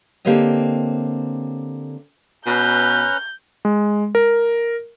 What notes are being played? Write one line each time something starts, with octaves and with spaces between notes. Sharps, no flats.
D3 A#3 C4 G4 C#5 D#5
B2 C#4 B4 A#5 G6
G#3
A#4